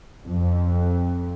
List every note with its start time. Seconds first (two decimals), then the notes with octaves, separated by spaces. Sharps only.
0.24 F2